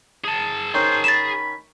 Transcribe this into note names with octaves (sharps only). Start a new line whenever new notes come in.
G#4 A5
D#3 C#4 C5
B5 A6 E7